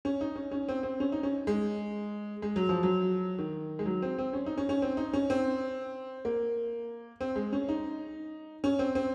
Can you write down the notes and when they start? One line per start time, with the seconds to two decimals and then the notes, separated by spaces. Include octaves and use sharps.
0.05 C#4
0.21 D#4
0.36 C#4
0.51 C#4
0.69 C4
0.83 C4
1.00 C#4
1.12 D#4
1.23 C#4
1.47 G#3
2.42 G#3
2.56 F#3
2.69 F3
2.83 F#3
3.38 D#3
3.79 G#3
3.86 F#3
4.02 C4
4.18 C4
4.33 C#4
4.46 D#4
4.58 C#4
4.69 C#4
4.82 C4
4.97 D#4
5.13 C#4
5.30 C4
6.25 A#3
7.21 C4
7.36 G#3
7.53 C#4
7.69 D#4
8.64 C#4
8.79 C4
8.95 C4